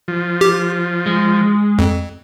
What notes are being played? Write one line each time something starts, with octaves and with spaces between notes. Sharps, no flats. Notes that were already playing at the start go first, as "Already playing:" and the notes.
F3
G4
G#3
F2